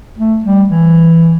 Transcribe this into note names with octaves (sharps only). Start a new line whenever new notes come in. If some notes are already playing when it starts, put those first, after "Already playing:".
A3
G3
E3